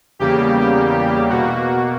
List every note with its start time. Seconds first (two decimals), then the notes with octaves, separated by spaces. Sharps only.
0.19 E2 C#3 G3 A#3 G4
1.29 B2 A#3 F#4